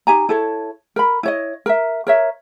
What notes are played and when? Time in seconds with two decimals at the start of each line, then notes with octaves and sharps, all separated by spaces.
0.07 D#4 G4 G#5 A#5
0.29 E4 A4 C#5
0.96 A#4 B5
1.23 E4 C#5 D#5
1.66 A#4 E5
2.07 A#4 C#5 E5